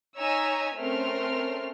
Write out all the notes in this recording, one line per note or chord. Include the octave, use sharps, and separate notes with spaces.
D#4 C#5 G#5 A#5 E6 B6
A3 C4 C#4 A#4 C6 F6